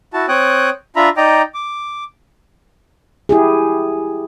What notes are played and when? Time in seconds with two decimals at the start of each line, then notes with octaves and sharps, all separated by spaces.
0.13 E4 F#4 A5
0.29 C4 C#5 G5 D#6 F#6
0.96 D4 F4 E5 A#5 B5
1.17 D#4 D5 D#5 G5 A#5
1.54 D6
3.29 E4 G4 G#4